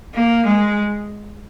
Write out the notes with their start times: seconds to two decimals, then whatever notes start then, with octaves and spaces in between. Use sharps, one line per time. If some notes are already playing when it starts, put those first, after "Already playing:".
0.15 A#3
0.46 G#3